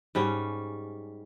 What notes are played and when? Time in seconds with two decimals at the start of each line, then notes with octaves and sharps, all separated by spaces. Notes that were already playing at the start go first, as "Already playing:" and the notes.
0.15 G#2 G3 C#4